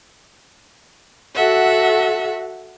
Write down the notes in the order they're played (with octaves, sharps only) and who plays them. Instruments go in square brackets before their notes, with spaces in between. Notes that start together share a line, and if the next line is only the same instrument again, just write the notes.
[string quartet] F#4 A4 E5 F#5